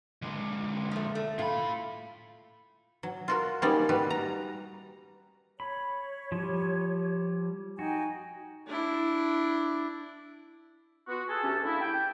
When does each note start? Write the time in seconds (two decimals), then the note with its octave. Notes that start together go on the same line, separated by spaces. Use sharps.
0.22 D3 G#3
0.91 F3 A3
1.15 A3
1.39 A2 F4 B5
3.03 F#3
3.28 F4 F#4 A#4
3.62 G3 A#3 C#4 D#4 D5
3.89 G3 F#4 B4
4.10 A#5
5.60 C#5 B5
6.32 F3 G3
7.79 D#4 F#4 G5 G#5
8.67 D4 E4
11.08 B3 F4 F#4
11.29 G#4 A4
11.43 D2 C#4 G4 A5
11.64 D3 A#3 E4
11.81 G5